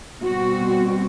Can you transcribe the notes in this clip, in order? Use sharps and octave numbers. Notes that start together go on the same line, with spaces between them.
B2 G3 C4 F#4